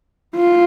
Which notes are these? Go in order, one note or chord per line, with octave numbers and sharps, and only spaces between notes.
F4